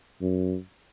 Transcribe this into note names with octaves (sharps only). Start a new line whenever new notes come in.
F#2